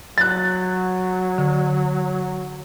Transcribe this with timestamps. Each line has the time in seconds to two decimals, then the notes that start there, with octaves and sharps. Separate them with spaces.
0.18 F#3 F#6 A6
1.38 D3